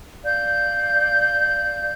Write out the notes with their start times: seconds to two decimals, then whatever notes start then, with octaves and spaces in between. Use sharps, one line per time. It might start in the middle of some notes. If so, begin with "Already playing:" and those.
0.24 D5 F5 G6